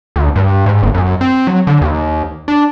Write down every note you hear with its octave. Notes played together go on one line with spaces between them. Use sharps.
D2
G2
G#2
G1
F#2
C4
F#3
D3
D#2
D4